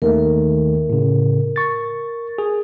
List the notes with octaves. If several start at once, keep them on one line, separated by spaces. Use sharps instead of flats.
D#2 D#3 A3 A#4
A2 C#3
C#6 A6
G#4